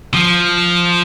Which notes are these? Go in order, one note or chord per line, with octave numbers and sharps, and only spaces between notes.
F3